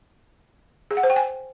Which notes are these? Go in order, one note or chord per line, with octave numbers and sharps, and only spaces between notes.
G#4
F#5
C5
G5
G#5